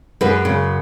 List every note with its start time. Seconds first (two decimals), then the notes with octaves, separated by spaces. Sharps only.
0.21 F#2 G#4 B4
0.45 C#3